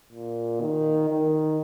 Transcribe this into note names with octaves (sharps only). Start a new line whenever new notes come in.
A#2
D#3
D#3